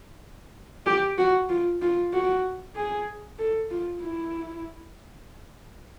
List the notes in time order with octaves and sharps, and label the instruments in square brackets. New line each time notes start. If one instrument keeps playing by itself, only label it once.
[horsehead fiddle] G4
F#4
F4
F4
F#4
G#4
A4
F4
E4